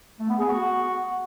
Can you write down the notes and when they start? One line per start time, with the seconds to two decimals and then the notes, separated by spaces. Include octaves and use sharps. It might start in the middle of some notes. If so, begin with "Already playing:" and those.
0.19 A3
0.29 B3
0.39 G#4
0.49 F#4